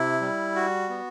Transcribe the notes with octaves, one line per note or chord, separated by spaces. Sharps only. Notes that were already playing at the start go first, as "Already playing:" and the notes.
Already playing: C3 E4
G3
F#4
B3